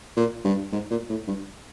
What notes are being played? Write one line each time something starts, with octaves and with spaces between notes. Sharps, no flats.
A#2
G2
G#2
A#2
A2
G2